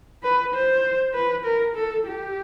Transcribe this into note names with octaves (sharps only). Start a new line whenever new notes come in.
B4
C5
B4
A#4
A4
G4